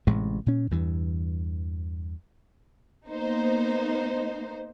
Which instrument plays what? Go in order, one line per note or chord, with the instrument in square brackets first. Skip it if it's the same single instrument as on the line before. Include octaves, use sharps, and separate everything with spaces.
[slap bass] A1 A2 C3 G#3
A#2 C#4
E2 G2 E3
[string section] A#3 B3 D#4 C5